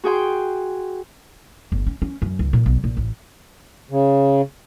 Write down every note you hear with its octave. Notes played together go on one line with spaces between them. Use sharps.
F#4 G#4 G5 C6
G1
C#4
C#4
F#2
C#2
A#2
B1
A#1
A1
C#3